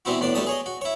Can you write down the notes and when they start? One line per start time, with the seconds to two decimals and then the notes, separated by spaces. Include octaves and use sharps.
0.05 E3 G3 B3 C4 E4 F#4
0.20 E2 A2 D4 D5
0.35 B2 D3 G3 A3 A5 D#6
0.46 G#4 C#5 D#5
0.66 F#4
0.81 E4 C#5